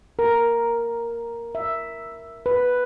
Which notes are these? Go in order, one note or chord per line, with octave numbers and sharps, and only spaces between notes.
A#4
E5
B4